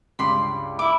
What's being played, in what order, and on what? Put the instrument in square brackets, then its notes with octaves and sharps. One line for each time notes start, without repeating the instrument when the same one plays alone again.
[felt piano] C#2 G2 D6 [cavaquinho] B5 C6
[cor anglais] E4 [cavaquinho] D6